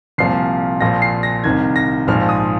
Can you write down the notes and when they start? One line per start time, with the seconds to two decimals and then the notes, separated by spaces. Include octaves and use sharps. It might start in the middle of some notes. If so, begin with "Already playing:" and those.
0.18 C2 A#2 F3 C7
0.81 A#1 A#2 F3 A#6
1.02 C7
1.23 A#6
1.44 C2 C3 D#3 G#6
1.76 A#6
2.07 A#1 G#2 F3 F6
2.29 D#6